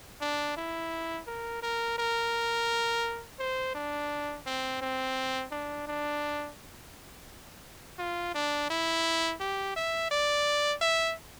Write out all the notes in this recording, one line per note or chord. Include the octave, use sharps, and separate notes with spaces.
D4
E4
A#4
A#4
A#4
C5
D4
C4
C4
D4
D4
F4
D4
E4
G4
E5
D5
E5